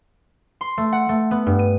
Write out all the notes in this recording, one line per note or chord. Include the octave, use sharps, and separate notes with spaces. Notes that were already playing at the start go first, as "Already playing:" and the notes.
C6
A3
F#5
A3
B3
G2
D#7